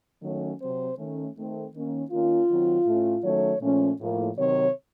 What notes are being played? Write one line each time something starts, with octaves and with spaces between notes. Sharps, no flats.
D#3 F#3 A3 C#4
C3 F#3 C4 C5
D#3 A3 C#4
D#3 A3 C4
D#3 A#3 C#4
D#3 A#3 C#4 F4
D#3 F#3 C4
A2 A3 C#4
D#3 F#3 A3 C#4 C#5
A#2 F3 A3 C#4
A2 F3 A#3
C3 D#3 F#3 C4 C#5